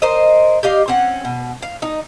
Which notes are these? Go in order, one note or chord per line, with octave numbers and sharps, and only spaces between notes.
A#4 C5 D#5
G4 D#5 F5
C4 C#4 F#5
B2
F5
D#4